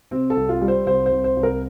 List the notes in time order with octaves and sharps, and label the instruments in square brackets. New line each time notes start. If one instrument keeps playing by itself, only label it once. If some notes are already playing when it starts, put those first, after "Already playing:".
[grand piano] C3 C4
A4
C2
F4
G3
C5
C2 C5
C5
C2
C5
C2
A#4